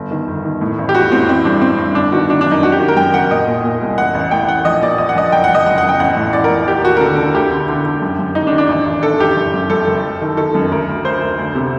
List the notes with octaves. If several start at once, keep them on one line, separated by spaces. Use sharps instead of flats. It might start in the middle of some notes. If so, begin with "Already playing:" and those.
Already playing: G1
D#3
G1
D#3
A2
A1
G4
A1 F#4
A2 C4
A1 C4
G2 D4
A1 C4
G2
G1 D4
D#3 F#4
D#3 D4
F#2 D4
D#4
F#2 F#4
G4
D#3
A#4
F#2 G5
F#1 F#5
A#2 D#5
A#2
A#2
C2
A1 F#5
A1
A2 G5
A1 F#5
A#1 D#5
A#2 D5
A#1 D#5
F#5
A#1 D#5
F#1 G5
F#5
F#1
D#5
F#1 F#5
F#5
F#1
G5
A1 F#5
A2
A1 D5
A#4
A2
D#2 G4
D#2 F#4
A#4
D3 A4
D3
D2 G4
D3
D3
D3
F#2
F#2
F#1 D#4
D4
D#3
D4
A1
A1
D#3 A4
A1 G4
F#1
F#2
F#2 A4
F#1
F#1
D#3
D#3 A4
F#2
D2 A#4
D2
D2 C5
D2
D2
C3